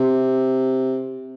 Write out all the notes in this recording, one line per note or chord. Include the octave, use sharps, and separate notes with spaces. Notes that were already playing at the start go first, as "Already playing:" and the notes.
Already playing: C3